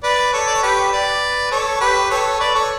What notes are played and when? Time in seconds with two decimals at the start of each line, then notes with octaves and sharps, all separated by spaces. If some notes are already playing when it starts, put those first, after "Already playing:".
0.03 B4 D5
0.33 A4 C#5
0.47 D5
0.55 C#5
0.63 G4 B4
0.92 B4 D5
1.51 A4 C#5
1.81 G4 B4
2.10 A4 C#5
2.40 B4 D5
2.55 A4 C#5